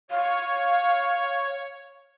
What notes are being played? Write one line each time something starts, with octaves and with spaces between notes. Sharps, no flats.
C#5 F5